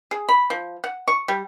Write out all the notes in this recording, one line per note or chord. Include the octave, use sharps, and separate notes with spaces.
G#4
B5
F3
F#5
C#6
G3